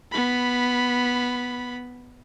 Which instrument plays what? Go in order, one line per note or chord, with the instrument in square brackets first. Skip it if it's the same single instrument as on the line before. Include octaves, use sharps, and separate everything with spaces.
[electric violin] B3 B5